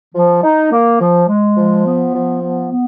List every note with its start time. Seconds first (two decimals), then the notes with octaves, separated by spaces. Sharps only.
0.15 F3
0.43 D#4
0.72 A#3
1.01 F3
1.29 G#3
1.57 F3
1.86 B3
2.15 F3
2.42 B3
2.71 B3